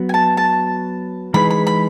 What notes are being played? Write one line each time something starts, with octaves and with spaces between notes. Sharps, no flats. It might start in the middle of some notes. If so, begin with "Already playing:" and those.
Already playing: F#3 B3 F#4 B4
G#5
A5
A5
E3 G#3 D#4 G#4 B4 B5
B5
B5